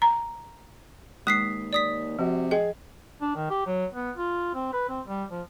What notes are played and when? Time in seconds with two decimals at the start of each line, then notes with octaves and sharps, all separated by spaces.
0.02 A#5
1.27 D#2 G#3 D#6 B6 C7
1.73 D5 D#6 B6
2.19 C3 F3 F#4
2.51 G#4 D#5 G5
3.21 D4
3.35 D#3
3.50 G4
3.66 F#3
3.94 B3
4.17 F4
4.54 C4
4.73 B4
4.89 C4
5.06 G3
5.31 F3